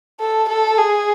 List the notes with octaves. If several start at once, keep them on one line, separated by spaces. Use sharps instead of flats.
A4
A4
G#4